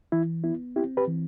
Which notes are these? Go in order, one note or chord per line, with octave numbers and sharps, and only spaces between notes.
E3 E4
B3 E4
C4 E4 G4
G4 B4
E3